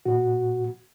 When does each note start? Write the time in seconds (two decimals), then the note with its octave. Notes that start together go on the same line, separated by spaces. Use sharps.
0.06 A#2 F#4